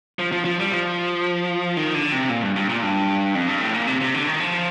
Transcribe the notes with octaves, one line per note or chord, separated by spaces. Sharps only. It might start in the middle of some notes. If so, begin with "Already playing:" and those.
F3
F3
F3
G3
F3
D#3
D3
C3
A#2
G2
G2
A#2
G2
F2
G2
A2
A#2
C3
C3
D3
D#3
F3